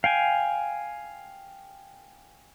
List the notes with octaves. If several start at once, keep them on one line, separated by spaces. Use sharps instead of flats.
F5 G5 G#5